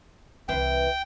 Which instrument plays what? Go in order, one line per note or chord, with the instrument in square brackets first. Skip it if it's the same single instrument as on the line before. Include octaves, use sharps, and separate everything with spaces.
[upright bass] C2 C4 [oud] E3 B4 C5 [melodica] G5